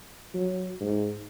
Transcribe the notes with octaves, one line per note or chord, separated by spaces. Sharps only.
F#3
G#2